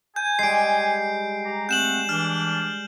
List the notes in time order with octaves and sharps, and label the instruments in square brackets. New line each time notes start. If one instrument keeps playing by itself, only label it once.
[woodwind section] G#5 [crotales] G6
[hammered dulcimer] G3 G#3 [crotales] C7 D7
[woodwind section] G4 A#5
[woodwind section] A3 C4 F#5 [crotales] G6 E7 F#7
[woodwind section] E3 D4 [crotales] F6